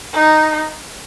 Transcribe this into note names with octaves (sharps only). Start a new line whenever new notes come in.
D#4